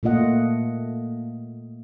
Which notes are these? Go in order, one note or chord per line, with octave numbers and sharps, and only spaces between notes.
A#2 A3 A#3 F4 D#5 F#5